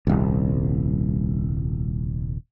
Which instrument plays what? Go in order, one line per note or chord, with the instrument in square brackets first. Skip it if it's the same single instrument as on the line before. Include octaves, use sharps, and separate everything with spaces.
[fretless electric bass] D#1 C2